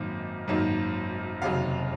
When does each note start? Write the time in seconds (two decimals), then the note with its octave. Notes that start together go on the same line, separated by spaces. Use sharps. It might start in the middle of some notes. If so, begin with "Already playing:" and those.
Already playing: G#1 F#2 D#3 F#3 A#3
0.48 G#1 F#2 D#3 F#3 A#3
1.42 F1 D#2 C#3 F#3 F5